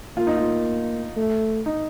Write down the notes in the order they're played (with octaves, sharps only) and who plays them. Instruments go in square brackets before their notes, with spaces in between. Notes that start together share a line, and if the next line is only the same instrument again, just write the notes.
[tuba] A#3 [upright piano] F4
[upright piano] D#4
F4
[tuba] A3
[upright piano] D#4